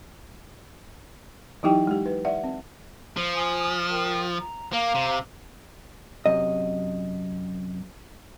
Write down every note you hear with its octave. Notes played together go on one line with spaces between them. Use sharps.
E3 F#3 D#4 E4 G4 G5
G#3 G4
B4
D5 E5 F#5
C4
F3
G#5 D#6
A#4 G5
A#5
A#3 F5 A#5 D6
C3
F#2 C3 D#5